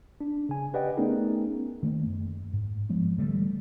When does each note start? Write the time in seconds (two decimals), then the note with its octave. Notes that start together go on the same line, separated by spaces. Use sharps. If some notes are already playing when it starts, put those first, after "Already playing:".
0.21 D4
0.49 C#3 G#5
0.74 G4 B4 D5 D#5 F#5 G5
0.97 A3 B3 C#4 D#4 G#4 A#4
1.83 D#3 A3 A#3
2.06 F#2
2.53 G#2
2.89 F3 G#3 B3
3.18 D3 E3 G3 A3